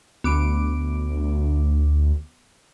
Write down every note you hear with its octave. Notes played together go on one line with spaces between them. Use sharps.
D2 B3 D6 D7